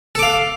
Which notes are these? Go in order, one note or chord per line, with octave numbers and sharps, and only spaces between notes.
A4 F5 D6